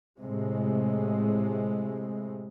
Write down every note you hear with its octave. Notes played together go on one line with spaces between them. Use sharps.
A2 C3 G#3